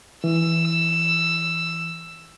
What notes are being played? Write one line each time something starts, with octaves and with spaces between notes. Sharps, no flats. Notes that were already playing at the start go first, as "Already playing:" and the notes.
E3 E6